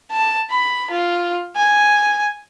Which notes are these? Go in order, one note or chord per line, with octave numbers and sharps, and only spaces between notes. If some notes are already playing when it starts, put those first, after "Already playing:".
A5
B5
F4
G#5